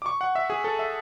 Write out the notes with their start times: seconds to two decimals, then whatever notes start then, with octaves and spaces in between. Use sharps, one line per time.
0.02 D6
0.06 C#6
0.21 F#5
0.35 E5
0.50 G#4
0.64 A4
0.79 E5